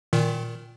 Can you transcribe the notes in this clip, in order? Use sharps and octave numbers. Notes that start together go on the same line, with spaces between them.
A#2 D#3